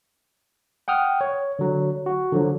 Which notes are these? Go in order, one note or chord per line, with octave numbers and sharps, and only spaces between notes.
F#5 G5 D#6 F6
C#5
D3 F#3
F#4
D3 F3 F#3